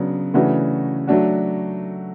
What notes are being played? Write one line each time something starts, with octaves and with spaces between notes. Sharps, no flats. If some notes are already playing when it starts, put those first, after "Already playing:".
Already playing: C#3 F#3 B3 D4
C#3 E3 A3 D4 F#4
F#3 A3 D4 F#4